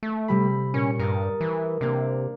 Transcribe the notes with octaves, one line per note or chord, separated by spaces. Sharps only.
A3
C3 G3 B5
A#2 C#4 C#7
G2 A#4 D#6 A6
E3
C3 A#3 D4